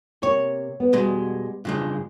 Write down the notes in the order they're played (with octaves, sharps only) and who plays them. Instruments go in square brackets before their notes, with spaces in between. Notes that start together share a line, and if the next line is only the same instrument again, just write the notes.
[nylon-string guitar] C3 A#3 [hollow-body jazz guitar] C#5
[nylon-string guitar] B3
[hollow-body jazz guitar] B2 G#3 [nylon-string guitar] G3
[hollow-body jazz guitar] G2 C#3 G#3 [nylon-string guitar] F4